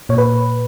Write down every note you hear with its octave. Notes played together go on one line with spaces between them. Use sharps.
A#2 C#5
B4